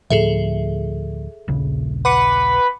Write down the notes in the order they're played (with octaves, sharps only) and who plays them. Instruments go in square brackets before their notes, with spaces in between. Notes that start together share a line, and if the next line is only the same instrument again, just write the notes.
[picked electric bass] D2 A2 F3 [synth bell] G#4 A4 E5
[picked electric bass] D#1 A#1 C#3
[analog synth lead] B4 [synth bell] F#5 D6 C#7